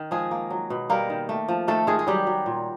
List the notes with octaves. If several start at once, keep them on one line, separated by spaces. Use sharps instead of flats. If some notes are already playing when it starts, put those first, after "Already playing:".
Already playing: D#3
F3 G#3 G#4
A#3
F#3
B2
G3 A#3 A#4
D#3
A3
F3
D#3 A3 A4
D#3 G#3 G#4
G#4
F#3 G3 G4
F#3
A#2